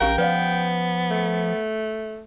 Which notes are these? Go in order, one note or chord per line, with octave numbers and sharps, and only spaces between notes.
A#1 C#4 G4 A#4 F5 G5
F3 B3 B4 D5 F5
A3